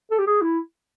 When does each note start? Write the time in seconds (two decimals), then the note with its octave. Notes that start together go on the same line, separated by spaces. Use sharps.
0.11 A4
0.18 G4
0.27 G#4
0.42 E4